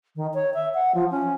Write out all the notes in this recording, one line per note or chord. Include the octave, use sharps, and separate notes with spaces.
D#3
C#5
E5
F#5
F3
C#4